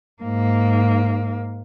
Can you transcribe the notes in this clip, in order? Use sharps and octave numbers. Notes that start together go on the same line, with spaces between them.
G#2 A#3